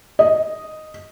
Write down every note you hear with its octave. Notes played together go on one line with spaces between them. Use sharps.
D#5